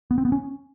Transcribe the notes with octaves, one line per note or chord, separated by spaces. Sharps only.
B3
C4
B3
C#4